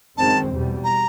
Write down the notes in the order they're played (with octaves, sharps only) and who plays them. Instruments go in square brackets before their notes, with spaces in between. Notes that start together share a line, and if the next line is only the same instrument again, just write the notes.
[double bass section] F#2 D#3 G#3 C4 [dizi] A5
[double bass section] E2 B2 G3
[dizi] A#5